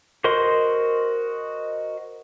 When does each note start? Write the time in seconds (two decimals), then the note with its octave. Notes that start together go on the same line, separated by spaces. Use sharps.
0.24 F#4 A#4 C5 D#5 C6